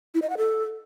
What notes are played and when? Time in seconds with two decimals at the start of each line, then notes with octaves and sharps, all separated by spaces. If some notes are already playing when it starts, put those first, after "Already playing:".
0.14 E4
0.22 D#5
0.30 F#5
0.37 A4